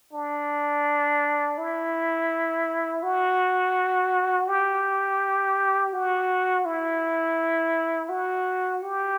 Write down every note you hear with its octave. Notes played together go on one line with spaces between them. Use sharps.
D4
E4
F#4
G4
F#4
E4
F#4
G4